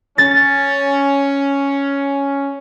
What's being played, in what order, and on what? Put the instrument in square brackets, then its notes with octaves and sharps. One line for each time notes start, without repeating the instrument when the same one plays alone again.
[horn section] C#4 [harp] A6